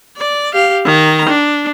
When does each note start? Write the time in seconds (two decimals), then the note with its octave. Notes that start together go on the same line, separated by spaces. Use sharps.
0.17 D5
0.53 G4 F5
0.85 D#3 A#5
1.29 D4